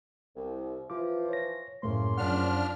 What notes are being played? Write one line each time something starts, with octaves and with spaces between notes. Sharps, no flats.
C2
E3 F3 F4 D6
C#5 A#6
F#2 A2 C#3 A3 A#3 C6
F#2 F3 D4 F#5 F6